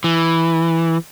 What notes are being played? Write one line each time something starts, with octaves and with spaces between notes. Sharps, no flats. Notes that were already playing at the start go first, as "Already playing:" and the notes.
E3